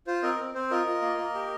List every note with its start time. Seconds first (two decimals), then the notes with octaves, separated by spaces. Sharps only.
0.07 F4 C5
0.23 C4 A#4 D#5
0.39 C4
0.54 C4 C5
0.71 F4 A#4 D#5
0.87 F4
1.02 A#3
1.18 A#3
1.34 G4